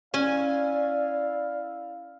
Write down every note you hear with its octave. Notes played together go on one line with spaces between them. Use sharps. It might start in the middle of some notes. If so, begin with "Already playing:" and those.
C#4 E4 D5 F5 G#5